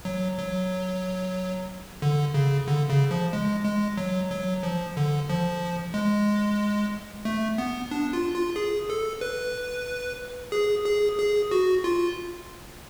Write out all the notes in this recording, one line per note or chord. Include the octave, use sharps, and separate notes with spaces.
F#3
F#3
D3
C#3
D3
C#3
F3
G#3
G#3
F#3
F#3
F3
D3
F3
G#3
A3
B3
D4
F4
F4
G#4
A4
B4
G#4
G#4
G#4
F#4
F4